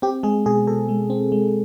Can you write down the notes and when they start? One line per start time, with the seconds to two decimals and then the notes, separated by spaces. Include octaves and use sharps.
0.02 C4 G4
0.23 G#3 G#4
0.46 B2 G#4
0.67 B2 A4
0.89 G#3
1.10 C4
1.32 G#3